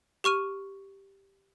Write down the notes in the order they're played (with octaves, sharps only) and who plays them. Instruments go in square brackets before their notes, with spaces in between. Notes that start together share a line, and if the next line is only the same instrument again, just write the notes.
[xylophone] G4 C#6 F6 D#7